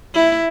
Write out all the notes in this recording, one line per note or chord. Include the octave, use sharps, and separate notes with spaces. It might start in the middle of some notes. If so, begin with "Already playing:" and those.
E4